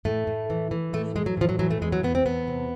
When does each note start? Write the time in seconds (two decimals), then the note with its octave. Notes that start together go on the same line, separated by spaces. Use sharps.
0.05 A2 A3
0.27 A2
0.50 E3
0.71 E3
0.93 A2 A3
1.15 E3 G#3
1.26 F#3
1.37 A2 F3
1.49 F#3
1.59 E3 F#3
1.71 A3
1.81 E2 G#3
1.92 F#3
2.03 E2 B3
2.15 C4
2.26 E2 B3
2.48 C3